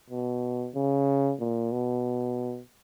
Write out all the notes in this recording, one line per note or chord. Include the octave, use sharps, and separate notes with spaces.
B2
C#3
A#2
B2